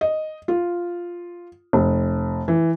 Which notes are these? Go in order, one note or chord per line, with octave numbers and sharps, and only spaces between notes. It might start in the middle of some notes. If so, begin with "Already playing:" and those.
D#5
F4
F1
E3